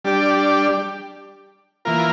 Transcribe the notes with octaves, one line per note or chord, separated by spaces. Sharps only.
G3 D4 G4 D5
E3 A#3 F4 A#4